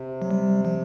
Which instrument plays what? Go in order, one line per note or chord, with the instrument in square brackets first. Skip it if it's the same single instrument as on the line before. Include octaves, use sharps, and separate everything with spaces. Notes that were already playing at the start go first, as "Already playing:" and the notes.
Already playing: [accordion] C3
[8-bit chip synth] F#3
G3
F3